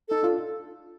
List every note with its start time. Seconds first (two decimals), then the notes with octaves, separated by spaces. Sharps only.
0.09 D#4 A4
0.23 D4 F4